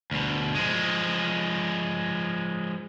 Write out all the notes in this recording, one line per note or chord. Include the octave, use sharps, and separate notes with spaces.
D2 B2
F3 G#3